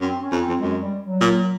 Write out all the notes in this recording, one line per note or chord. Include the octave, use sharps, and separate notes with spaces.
F#2 C4
C#4
F2
C4
F2
F#2 G#3
G3
F#3
A#2